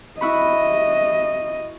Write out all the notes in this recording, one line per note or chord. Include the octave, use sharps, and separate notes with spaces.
E4 F#4 D#5 B5